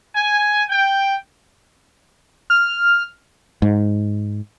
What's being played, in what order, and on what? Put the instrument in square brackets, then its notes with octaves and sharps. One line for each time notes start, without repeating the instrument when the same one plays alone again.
[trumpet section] G#5
G5
[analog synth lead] F6
[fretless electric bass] G#2